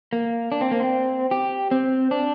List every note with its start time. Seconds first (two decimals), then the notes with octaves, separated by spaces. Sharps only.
0.13 A#3
0.52 D4
0.61 C4
0.71 A#3
0.80 C4
1.31 G4
1.71 C4
2.11 D4